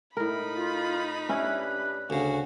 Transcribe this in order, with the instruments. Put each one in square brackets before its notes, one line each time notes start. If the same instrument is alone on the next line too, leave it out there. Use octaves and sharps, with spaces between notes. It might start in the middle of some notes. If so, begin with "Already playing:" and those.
[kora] A2 A#4 [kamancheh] D#4 B5
[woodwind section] F4
[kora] C#4 E4 [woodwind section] D4 G4 B4
[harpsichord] D2 C#3 [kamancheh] F#4